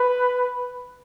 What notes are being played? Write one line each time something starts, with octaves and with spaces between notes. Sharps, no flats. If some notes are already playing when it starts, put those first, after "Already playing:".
Already playing: B4